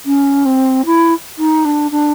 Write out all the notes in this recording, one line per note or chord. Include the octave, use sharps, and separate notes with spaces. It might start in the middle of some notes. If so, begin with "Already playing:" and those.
C#4
C4
E4
D#4
D4
D4